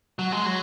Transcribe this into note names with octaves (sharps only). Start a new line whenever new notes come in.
F#3
G#3
F#3